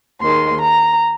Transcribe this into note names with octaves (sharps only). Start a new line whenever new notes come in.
D#2 D#3 G#3 C6
A#5